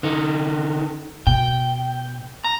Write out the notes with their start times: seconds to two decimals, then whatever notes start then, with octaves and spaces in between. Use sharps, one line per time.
0.03 D3 D#4
1.27 B2 G5
2.44 A#5